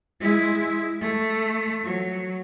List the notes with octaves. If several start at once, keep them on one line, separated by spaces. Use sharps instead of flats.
G#3 E4
A3
F#3